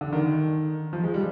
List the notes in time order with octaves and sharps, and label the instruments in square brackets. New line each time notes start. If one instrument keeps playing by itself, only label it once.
[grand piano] D3
D#3
F3
G#3
G3